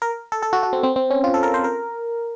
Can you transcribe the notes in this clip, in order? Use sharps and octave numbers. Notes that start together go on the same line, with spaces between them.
A#4
A4
A4
F#4
F#4
C4
C4
C4
C#4
F4
A4
A#4
C5
A#4